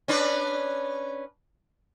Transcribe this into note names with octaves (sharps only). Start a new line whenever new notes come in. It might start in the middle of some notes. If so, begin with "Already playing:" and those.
C#4 D4 B4